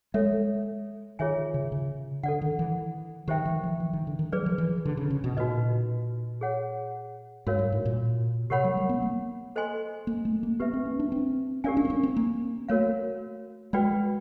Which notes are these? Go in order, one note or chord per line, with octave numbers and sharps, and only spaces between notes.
G#3 A4 C#5 E5
D#3 F4 G#4 C#5 E5 G#5
C#3
C#3
D3 A4 D5 F#5
D#3
E3
D#3 G4 C5 E5 G5
E3
F3
E3
D#3
D3
D#3
F#3 G#4 B4 D5
F3
E3
D3
C#3
C#3
B2
A#2 D#4 F#4 B4 D#5
G#4 C#5 F#5
G#2 F#4 A#4 C#5 F5
G2
A2
A#2
C3 G4 A#4 C#5 F#5 B5
F#3
G3
B3
A#3
A4 C5 D#5 G#5 C6
A#3
A3
A#3
B3 G4 B4 E5
C4
C#4
D4
C4
C#4 G4 A#4 D5 F5 G#5
D4
C4
C#4
C4
A#3
A3 F#4 A#4 C#5 F5
G#3 F#4 B4 D5 G5 B5